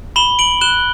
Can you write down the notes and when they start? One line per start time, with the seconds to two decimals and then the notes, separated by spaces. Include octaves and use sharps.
0.16 B5 E7 G7
0.39 D7 F#7
0.61 F#6 E7 G7